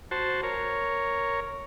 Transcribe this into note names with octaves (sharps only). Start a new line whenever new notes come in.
F#4 C5 A5
A#4 C#5